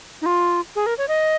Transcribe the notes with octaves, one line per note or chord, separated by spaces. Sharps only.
D#4
F4
G#4
A#4
C#5
D#5